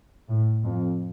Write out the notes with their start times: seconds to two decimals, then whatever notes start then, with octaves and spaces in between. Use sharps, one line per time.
0.29 A2
0.64 F2